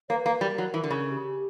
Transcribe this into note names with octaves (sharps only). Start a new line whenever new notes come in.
A#3 C#5
B4
A#3
G3 A#4
F#3
E3
D3
C#3
A#4
G4